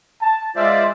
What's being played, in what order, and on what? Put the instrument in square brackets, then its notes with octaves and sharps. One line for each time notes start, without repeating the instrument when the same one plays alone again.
[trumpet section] A5
[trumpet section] G#3 E5 [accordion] F4 C5 D5